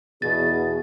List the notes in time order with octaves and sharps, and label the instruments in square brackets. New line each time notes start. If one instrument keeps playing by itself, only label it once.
[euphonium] E2 [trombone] B2 [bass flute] G#4 [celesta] A6